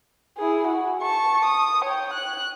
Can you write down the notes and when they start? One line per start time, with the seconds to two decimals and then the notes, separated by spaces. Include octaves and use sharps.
0.37 E4 G#4
0.67 F#4
1.01 A5 C#6
1.45 D#6
1.85 C#5 G5
2.13 F#6